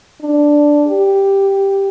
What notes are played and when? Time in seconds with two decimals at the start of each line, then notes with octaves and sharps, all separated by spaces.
0.22 D4
0.88 G4